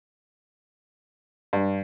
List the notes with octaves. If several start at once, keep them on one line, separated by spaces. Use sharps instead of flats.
G2